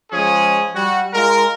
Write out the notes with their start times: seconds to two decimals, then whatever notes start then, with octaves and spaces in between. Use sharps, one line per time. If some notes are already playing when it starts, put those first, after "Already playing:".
0.12 F3 G#3 C#4 G#4
0.76 G3 F#4
1.14 G#3 F4 A#4